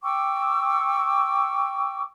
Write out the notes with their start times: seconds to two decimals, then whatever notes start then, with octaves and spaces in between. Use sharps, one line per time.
0.03 G5 C#6 D6 E6